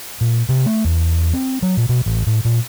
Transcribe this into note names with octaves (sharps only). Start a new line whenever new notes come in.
A#2
C3
A3
E2
C4
F#3
A#2
B2
A1
A2
A#2